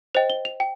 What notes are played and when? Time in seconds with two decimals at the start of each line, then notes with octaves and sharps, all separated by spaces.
0.15 C5 D#5 G5 F7
0.30 G7
0.45 F7
0.60 G5